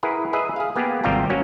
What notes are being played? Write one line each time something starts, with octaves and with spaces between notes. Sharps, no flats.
E4 G#4 A#4 B4 F#5
G#4 B4 D#5 E5
G#4 F5
A#3 B3 G4 G#4
G#1 C3 G3 F4 G5 A#5
F#3 A#3 C#4 F#4